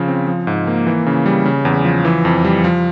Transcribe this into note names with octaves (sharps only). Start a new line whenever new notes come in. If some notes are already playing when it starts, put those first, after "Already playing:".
Already playing: C#3 F3
C4
F3
G#2
A#3
E3
C#3
G3
C#3
E2
F3
E3
F2
G3
F3